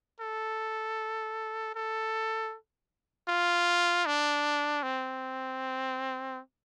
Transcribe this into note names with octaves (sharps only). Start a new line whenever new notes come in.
A4
A4
F4
D4
C4